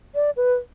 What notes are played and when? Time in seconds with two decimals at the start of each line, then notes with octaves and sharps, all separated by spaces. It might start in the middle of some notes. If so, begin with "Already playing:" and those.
0.15 D5
0.37 B4